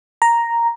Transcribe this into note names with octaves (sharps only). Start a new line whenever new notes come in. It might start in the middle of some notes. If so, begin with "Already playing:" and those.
A#5